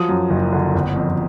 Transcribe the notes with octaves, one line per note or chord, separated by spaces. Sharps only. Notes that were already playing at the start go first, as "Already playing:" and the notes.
Already playing: F3 F#3 D#6
F#2
F#1
D3
G1
F2